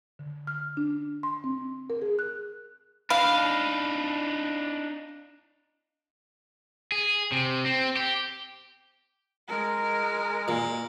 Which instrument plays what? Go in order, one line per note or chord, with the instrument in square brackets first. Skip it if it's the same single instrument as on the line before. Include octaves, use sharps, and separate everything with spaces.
[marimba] D3
F6
D4
C6
C4
A#4
G#4
F#6
[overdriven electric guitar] D4 D#4 [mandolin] F5 [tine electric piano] B5
[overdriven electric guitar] G#4
C3
C4
G4
[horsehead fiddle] G#3 A#4
[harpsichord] A#2